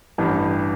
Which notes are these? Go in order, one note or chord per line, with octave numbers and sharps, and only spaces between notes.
A1 G2 E3